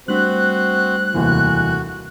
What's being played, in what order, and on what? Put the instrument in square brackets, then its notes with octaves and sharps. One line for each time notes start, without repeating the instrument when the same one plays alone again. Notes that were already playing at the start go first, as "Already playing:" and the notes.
[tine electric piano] G3 A3 D4 [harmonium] C4 F#4 C5 [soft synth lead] F#6
[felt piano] F1 D#2 E3 [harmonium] F#4